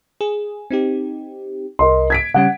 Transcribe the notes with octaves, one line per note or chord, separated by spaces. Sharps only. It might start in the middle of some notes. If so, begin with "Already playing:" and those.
G#4
C4 D#4 G4
C2 A#4 D#5 C6
G#6 B6 D7
C#3 G3 C#4 F#5